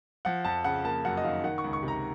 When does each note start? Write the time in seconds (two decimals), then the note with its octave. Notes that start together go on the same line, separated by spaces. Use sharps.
0.25 F3 F#5
0.45 F2 A5
0.64 C#3 F#5
0.84 A#3 A5
1.05 F#2 F#5
1.17 D#5
1.25 D#3 F5
1.44 D#3 F#5
1.58 C#6
1.64 C#2
1.73 C#6
1.83 C3 A#5